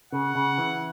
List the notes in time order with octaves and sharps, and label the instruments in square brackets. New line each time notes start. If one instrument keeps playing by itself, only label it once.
[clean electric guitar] C#3 [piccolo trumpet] F#5
[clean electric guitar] C#3
E3